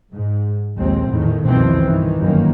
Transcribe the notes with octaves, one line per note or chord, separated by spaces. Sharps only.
G#2
A#1 D#2 G#3 C4
E2 A2 D#3
C2 F2 B2 D#3 E3 C4
G2 D#3 E3
G1 F#2 D#3 A#3